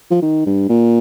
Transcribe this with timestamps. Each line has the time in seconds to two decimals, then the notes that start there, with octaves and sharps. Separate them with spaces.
0.11 F3
0.22 D#3
0.46 G2
0.69 A#2